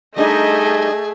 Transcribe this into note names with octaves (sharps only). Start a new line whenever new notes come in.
G3 A3 D4 D#4 G#4 D#5